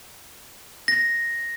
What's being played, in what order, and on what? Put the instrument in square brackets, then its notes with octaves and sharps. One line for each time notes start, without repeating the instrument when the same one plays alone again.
[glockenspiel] A#6